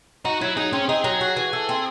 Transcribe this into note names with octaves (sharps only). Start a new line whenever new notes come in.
D#4 F#4
F#3 E4
D#4 G#4
C4 C#4
D#4 G#4
F#3 G#4
F#4
E3
A4
C4